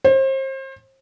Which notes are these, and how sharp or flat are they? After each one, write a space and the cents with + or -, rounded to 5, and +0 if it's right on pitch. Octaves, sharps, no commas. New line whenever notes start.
C5 +35